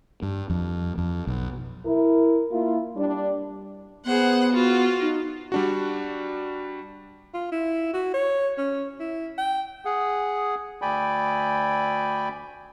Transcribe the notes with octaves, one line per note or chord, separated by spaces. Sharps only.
G2
F2
F2
B1
E4 A#4
A#3 E4 F4
G3 D4
B3 G#4 C5 F#5
F4 F#4
D#4
G3 D4 F#4
F4
E4
F#4
C#5
C#4
E4
G5
G#4 F#5
D2 D5 G5 G#5 B5